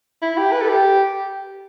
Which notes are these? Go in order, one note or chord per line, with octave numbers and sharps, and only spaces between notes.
E4
G4
B4
A4
G4